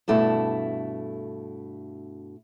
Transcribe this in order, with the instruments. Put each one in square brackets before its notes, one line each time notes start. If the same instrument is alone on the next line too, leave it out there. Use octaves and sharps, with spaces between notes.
[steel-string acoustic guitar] G2 B2 A3 E4 A5